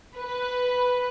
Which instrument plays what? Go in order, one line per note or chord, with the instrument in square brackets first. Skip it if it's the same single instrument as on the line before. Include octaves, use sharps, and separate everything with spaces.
[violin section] B4